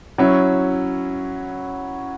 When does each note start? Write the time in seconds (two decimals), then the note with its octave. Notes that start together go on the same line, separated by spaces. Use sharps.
0.18 F#3 C#4 E4